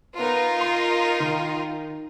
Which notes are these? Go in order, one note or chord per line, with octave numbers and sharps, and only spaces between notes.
B3 D#4 F4 A#4
C6 C7
D#3